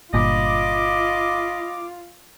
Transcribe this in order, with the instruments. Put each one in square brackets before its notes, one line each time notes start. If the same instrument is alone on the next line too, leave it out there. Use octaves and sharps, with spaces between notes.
[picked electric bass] G1 G2 A#2 [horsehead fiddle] F4 [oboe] D#5 [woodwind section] B5 D6